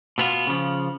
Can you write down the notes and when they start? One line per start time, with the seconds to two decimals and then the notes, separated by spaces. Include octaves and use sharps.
0.18 B2 B3 F4
0.47 C#3 F3